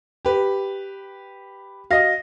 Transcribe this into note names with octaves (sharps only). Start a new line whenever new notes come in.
G4 B4
F#4 D#5 F5 A#6